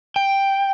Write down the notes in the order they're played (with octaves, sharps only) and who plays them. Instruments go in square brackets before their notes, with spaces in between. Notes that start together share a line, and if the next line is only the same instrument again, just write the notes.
[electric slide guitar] G5